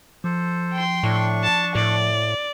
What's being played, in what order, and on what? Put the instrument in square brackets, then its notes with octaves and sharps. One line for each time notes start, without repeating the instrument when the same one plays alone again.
[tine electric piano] F3 [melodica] A4 C5
[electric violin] G5 C6
[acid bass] A2 [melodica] D4 C#6
[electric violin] A5
[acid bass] A2 [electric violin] D5